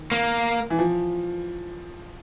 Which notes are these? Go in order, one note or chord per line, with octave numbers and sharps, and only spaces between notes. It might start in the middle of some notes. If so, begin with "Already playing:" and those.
Already playing: D#3
A#3
E3
F3